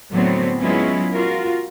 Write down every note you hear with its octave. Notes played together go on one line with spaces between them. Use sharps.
A2 D3 F#3 B3 C4
F#3 G#3 B3 C#4 E4 F4
F4 F#4 A#4